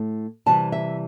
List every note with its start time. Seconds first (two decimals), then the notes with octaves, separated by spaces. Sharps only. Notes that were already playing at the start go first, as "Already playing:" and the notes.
Already playing: A2 A3
0.46 C3 E3 G3 A5
0.72 E5